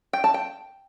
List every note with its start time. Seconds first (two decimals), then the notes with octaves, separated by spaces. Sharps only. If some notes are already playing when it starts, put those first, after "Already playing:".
0.13 G5
0.24 A5
0.34 G5